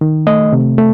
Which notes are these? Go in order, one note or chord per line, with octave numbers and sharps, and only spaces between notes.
D#3
A3 D#5
C3
A3